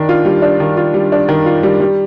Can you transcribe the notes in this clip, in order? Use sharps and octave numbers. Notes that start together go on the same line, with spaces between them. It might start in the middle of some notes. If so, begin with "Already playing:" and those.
Already playing: D#3 D4
F4
G3
D4
D#3
F4
G3
D4
D#3
F4
G3
G3